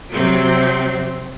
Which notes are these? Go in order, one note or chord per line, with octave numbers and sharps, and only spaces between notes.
C3 F#3 C4